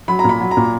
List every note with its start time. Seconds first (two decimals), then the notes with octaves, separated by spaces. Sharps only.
0.08 F#3 B5
0.19 A#5
0.24 A#2 B5
0.40 F#3
0.51 A#5
0.57 A#2